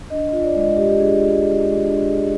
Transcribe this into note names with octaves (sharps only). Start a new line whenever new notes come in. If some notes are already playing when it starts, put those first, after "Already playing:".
D4 D#5
F4 D#5
D5
G#3
D#5
G#3 G4
G4
D4 G#4
F4
G#3
G#3
D4
F4 G#4